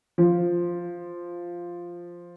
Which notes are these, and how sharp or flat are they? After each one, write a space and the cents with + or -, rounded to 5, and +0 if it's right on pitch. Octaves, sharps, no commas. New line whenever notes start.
F3 +0